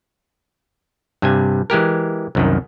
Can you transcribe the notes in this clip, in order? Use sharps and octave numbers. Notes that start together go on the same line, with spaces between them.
G2 C3 G#5
E3 G#3 G4 A#4
C2 F#2 D#3